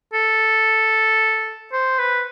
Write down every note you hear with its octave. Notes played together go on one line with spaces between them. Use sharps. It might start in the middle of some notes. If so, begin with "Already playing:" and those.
A4
C5
B4